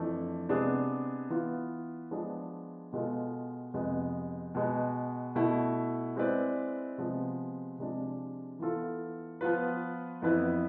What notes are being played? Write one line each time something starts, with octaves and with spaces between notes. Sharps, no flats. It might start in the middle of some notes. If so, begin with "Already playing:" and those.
Already playing: F2 E3 A3 D4
C3 G#3 B3 D4 G#4
E3 B3 F4
F3 G#3 B3 D4 G#4
B2 G#3 B3 F4 A4
F2 C3 G#3 B3
B2 G#3 B3
B2 A3 E4
G#3 C4 E4 B4 D5
C3 F3 G#3 B3
C3 F3 G#3 D4
E3 B3 F4 A4
F3 B3 F4 B4
F2 E3 B3 E4 B4